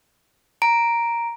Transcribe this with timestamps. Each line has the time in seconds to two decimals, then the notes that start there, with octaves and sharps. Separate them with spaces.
0.62 A#5 D7